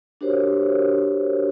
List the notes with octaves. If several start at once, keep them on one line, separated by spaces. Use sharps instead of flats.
D4 F#4 G4 A#4 C5 C#5